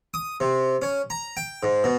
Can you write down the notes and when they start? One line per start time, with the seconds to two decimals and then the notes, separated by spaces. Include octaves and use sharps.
0.14 D#6
0.40 C3
0.82 C#4
1.10 A#5
1.37 G5
1.63 G#2
1.84 B2